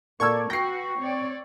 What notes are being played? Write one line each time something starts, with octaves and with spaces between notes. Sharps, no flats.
A#2 A#3 A4 D5 C#6 E6 G#6
F#4 B4 G5 C#6 A#6 C7
C4 C#5 D5